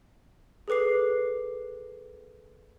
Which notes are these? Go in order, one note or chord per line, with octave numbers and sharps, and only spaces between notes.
G#4 A4 B4 D6 C7